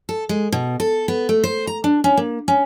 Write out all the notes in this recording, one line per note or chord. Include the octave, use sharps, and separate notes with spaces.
A4
G#3
B2
A4
B3
A3
C5
A#5
D4
C#4
A#3
C#4